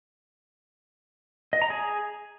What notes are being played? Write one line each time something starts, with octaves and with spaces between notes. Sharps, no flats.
D#5
A#5
G#4